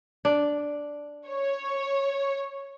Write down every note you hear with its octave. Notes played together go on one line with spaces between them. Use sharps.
D4
C#5